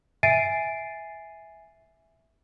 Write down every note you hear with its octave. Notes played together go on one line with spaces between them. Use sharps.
E5 G#5 A6 C7 D7 D#7